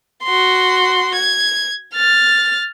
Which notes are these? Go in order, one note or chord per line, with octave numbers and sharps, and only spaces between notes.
F#4 C6
G#6
F6 A6